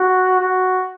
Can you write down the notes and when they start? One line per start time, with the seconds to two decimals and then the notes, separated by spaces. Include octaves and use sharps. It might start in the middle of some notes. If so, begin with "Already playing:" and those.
Already playing: F#4
0.40 F#4